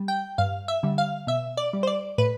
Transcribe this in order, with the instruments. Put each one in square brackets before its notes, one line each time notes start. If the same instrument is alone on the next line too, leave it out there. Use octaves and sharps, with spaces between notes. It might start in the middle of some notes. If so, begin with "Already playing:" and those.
Already playing: [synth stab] G3
G5
G2 F5
E5
D3 G3
F5
B2 E5
D5
G3
C5
D5
A2 B4